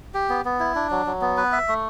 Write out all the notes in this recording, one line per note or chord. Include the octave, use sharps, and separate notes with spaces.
G4
B3
B3
E4
D4
F#3
F#3
B3
B4
E5
A3